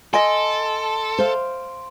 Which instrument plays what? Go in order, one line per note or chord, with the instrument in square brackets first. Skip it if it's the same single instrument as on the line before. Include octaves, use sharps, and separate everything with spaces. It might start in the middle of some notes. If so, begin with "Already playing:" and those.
[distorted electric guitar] A4 [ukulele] D#5 G#5 [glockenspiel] C6 D7
[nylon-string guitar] C5 F5